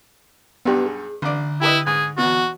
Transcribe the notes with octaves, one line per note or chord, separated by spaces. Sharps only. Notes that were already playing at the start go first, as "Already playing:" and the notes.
B1 G2 B3 G4
G#4
A1 D3 D5
E4 G4 B4 D#5
G#2 G#4
E2 B2 F#4